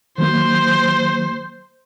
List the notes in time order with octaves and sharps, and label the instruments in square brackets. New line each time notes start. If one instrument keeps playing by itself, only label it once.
[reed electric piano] D#3 F#3 A#3 [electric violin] C5